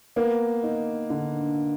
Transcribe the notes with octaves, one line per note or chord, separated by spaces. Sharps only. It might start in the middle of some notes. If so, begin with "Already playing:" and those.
A#3 B3
D#4
D3